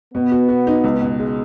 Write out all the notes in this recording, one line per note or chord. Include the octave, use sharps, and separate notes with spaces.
B2 B3
F#4
F#4
D#4
C#2
B2
G#3